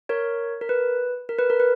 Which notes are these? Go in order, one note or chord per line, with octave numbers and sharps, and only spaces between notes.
A#4 C#5
A#4
B4
A#4
B4
A#4
B4